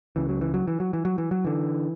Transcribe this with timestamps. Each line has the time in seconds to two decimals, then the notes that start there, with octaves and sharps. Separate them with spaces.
0.16 C#2 C#3 E3
0.29 F#3
0.41 E3
0.54 F#3
0.68 E3
0.80 F#3
0.93 E3
1.05 F#3
1.18 E3
1.31 F#3
1.45 D3 E3